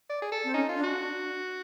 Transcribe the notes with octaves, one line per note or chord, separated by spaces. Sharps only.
D5
G#4
A4
C4
C#4 D#4
F4
D4
F#4
D4